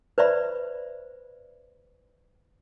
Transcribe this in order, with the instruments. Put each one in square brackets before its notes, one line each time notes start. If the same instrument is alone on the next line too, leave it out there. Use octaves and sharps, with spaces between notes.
[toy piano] B4 C5 D5 E5 B5